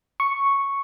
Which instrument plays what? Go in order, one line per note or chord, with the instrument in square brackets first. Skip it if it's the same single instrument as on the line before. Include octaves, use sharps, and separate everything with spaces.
[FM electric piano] C#6